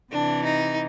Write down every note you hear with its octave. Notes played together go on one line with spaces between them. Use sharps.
C3 E3 D4
D#4